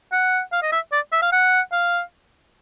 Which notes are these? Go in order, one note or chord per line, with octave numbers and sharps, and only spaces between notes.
F#5
F5
D#5
E5
D5
E5
F5
F#5
F5